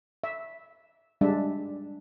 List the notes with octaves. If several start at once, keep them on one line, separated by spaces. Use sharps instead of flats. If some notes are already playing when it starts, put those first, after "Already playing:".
E5
G3 G#3 D4 E5